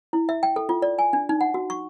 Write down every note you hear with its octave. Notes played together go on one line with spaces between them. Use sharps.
E4
E5
G5
A4
F4
D5
G#5
D4
D#4
F#5
F#4
C#6